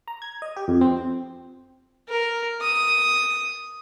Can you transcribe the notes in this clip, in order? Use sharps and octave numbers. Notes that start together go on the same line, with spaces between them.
A#5
G#6
D#5
G4
F2
C4
A#4
D#6